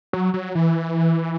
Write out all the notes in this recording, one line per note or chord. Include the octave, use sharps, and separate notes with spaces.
F#3
F#3
E3